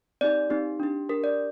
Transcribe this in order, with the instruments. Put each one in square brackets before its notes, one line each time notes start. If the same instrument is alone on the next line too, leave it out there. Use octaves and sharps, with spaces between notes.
[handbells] C4 D#4 G4 D5
C4 D#4 G4
D4 G4
D4 G4 A#4
D5